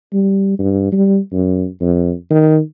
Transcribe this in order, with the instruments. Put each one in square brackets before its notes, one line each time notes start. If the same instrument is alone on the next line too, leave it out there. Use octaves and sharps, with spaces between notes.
[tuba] G3
G2
G3
F#2
F2
D#3